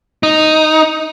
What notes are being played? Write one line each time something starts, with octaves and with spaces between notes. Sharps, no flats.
D#4